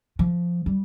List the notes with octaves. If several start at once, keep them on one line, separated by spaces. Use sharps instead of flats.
F3
G3